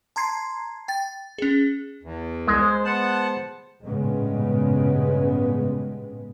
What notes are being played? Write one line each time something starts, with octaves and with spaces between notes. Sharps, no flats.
A5 A#5 C6 G#6 C7
G5 A6
C#4 G#4
E2
C2 G#3
C5
B3 C5 F#5 A5
A1 G2 A#2 C#3 G#3 B3